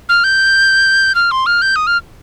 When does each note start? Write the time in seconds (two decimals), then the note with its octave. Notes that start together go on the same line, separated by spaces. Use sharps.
0.09 F6
0.24 G6
1.15 F6
1.31 C6
1.46 F6
1.62 G6
1.76 D#6
1.87 F6